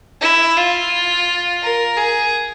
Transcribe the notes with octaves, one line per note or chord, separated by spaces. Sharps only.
E4
F4
A#4
G#4